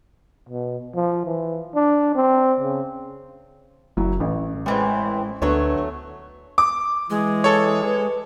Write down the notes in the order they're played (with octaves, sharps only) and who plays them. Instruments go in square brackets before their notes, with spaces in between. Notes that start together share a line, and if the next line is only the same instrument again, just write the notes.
[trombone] B2
F3
E3
D4
C4
C#3
[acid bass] F#1 [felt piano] F#3 E4
[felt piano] A1 [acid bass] E3
[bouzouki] A2 E3 C4 [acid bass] G#3
[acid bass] D2 [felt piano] D3 B3 [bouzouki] F#3 A3 C#5
[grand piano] D6
[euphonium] E3 [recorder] G#3
[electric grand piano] A4 C#5
[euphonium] B4